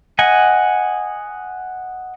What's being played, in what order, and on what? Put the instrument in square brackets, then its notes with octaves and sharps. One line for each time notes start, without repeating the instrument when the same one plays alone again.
[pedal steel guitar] D#5 F#5 G#5